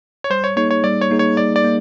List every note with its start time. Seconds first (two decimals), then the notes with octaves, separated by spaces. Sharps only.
0.24 C#5
0.30 G3 C5
0.44 C#5
0.57 A#3 D#4 G#4 C#5
0.71 C#5
0.84 G3 D5
1.01 C#5
1.11 A#3 D#4 G#4
1.19 C#5
1.37 G3 D5
1.56 D5
1.64 A#3